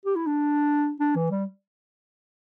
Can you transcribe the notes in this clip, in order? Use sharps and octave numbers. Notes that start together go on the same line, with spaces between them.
G4
E4
D4
D4
E3
G3